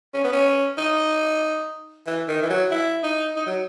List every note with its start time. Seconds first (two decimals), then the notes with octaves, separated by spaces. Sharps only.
0.14 C#4
0.24 B3
0.32 C#4
0.78 D#4
2.07 E3
2.28 D#3
2.42 E3
2.50 F#3
2.71 E4
3.03 D#4
3.36 D#4
3.46 F#3